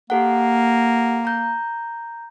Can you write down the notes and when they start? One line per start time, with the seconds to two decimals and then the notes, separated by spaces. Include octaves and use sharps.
0.10 A#3 G4 A4 F#5
1.25 A#5 G6